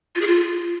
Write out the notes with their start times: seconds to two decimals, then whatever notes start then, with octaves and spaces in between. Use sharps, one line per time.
0.15 F4
0.21 G#4
0.27 F4